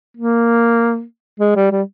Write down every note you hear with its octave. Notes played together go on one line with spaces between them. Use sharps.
A#3
G#3
G3
G3